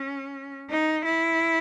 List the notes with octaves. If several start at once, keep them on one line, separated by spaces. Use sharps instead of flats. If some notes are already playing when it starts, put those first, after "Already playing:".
Already playing: C#4
D#4
E4